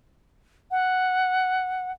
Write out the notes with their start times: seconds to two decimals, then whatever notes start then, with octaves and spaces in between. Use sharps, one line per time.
0.71 F#5